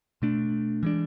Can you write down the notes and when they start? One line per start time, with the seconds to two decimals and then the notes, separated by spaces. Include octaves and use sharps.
0.22 B2 A3 D4
0.83 E3 G#3 D4